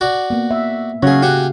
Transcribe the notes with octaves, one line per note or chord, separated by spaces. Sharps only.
F#4 D5
A#3 B3
E5
C#3 F#3 C#4 G#4 F5
F#4 G4 F#5 G#5